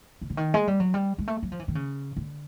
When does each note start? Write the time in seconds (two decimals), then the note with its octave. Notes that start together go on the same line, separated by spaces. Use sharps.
0.21 C#3
0.30 D3
0.37 D#3
0.54 G#3
0.68 G3
0.80 F#3
0.94 G3
1.18 G#3
1.28 A3
1.43 F#3
1.52 F3
1.59 E3
1.68 D#3
1.75 C#3
2.17 D3